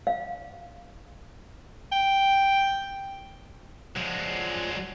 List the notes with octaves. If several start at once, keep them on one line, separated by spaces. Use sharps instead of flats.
F5
G5
F3 F#3 G#3 D4 F#5